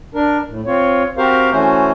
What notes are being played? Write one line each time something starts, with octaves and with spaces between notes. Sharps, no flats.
D4 A#4
A2
C4 F4 C#5
C4 F#4 G4 A#4 C5 F5
E3 A3 C#4 F#4 C5